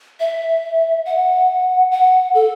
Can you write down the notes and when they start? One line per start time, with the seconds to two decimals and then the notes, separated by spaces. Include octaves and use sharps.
0.20 E5
1.06 F#5
1.91 F#5
2.35 A4